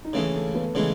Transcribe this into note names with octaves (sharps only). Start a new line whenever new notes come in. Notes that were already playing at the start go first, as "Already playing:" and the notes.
D#4
C#3 E3 G#3 A3 C#4
A3
B3
C#3 E3 G#3 A3 C#4